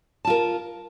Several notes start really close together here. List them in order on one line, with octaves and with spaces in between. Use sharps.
A5 F4 A#4